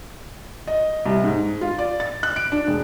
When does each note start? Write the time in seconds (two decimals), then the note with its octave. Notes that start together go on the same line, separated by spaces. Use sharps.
0.67 D#5
1.06 C2
1.24 G#2
1.61 F4
1.78 D5
2.00 A6
2.23 F#6
2.36 D7
2.52 D4
2.67 E1